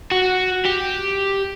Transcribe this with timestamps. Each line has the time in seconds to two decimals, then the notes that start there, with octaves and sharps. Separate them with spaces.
0.12 F#4
0.65 G4